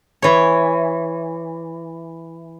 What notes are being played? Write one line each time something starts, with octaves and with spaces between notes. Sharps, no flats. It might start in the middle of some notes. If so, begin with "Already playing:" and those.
E3 C#5